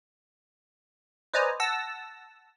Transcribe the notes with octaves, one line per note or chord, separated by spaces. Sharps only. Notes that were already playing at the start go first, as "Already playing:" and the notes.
B4 C5 D5 D#5 G#5 A#5
F#5 A5 E6 A#6